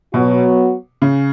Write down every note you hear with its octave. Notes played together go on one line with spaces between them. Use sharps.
B2 F#3 B3 F#4
C#3